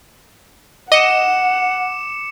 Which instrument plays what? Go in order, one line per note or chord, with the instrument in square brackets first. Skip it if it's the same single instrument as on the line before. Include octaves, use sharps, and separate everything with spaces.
[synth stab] D#5 [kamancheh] F#5 [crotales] D6 C#7 E7